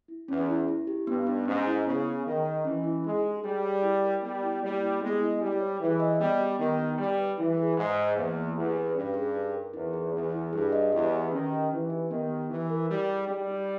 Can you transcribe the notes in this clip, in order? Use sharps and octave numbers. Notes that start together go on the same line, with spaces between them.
E4
E2 C#4
E4
E4
G4
G2 B3
D#4
G#2 C#4
E4
C#3 B3
D#4
D#3 G#4
D#5
E3 C#4
E4
G#3 D#4
G4
G3 G#4
C#5
E4
A#4
G3 B3
E4
G3 A#3
E4
G#3 B3
E4
G3 G4
C#5
E3 G#4
D#5
G3 B3
G4
D#3 B3
D#4
G3 G4
B4
E3 E4
G#4
G#2 G#4
D#5
E2 A#3
E4
E2 G4
B4
G2 C#4
G#4
D#4
A#4
E2 D#4
G#4
E2 B3
E4
G2 G#4
D#5
E2 G4
B4
D#3 C#4
G4
E3 D#4
G4
D#3 B3
G4
E3 D#4
A#4
G3 E4
G#4
G3 D#4
G4